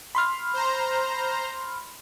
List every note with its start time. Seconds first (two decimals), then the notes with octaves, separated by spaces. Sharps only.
0.15 B5 C6 F6
0.53 C5 A#5